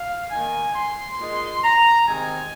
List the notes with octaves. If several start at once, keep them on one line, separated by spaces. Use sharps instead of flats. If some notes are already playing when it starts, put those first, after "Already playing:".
Already playing: F5
D#3 A#3 D#4 G#5
C6
A#2 G#3 D#4
A#5
C3 D#3 G#3 C4 D#4 G#5